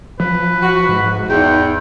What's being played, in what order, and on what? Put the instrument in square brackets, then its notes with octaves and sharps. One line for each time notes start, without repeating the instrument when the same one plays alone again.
[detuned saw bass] F3 [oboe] B4
[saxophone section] F#4
[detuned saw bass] G#2
[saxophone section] E2 [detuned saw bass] D#4 [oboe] G5